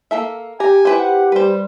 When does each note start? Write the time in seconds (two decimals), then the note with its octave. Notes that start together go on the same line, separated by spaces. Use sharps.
0.11 A#3 A4 E5
0.60 G4 G#5 A#5
0.85 E4 B4 C5
0.99 F#5
1.32 G3 B4 C5